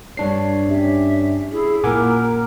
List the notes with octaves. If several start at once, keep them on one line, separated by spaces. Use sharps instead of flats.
G2 D4 C#5 C7
C#4 G4 E5
E4 G#4
A#2 A#3 A#4 F#5 G#5 A#5 D6